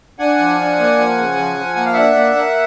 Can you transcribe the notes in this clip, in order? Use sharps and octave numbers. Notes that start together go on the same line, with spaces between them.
D4 F#5 G#5
F3
D4
A#3
F3
C#3
F3
F3
A#3 F#5
F5
D4 E5 F#5
A#3
A#3